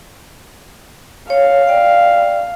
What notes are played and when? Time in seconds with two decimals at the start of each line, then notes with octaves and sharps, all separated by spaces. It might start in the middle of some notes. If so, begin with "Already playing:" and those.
1.30 C#5 F5
1.67 D5 G5